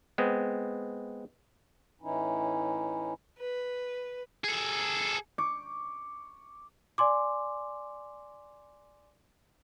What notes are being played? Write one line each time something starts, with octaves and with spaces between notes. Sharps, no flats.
G#3 B3 C4
A2 E3 C#4 D#4 E4
B4
G#4 A4
C#6 D6
D5 G#5 C6 D6